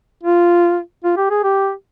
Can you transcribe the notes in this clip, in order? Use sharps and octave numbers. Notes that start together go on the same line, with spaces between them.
F4
F4
G4
G#4
G4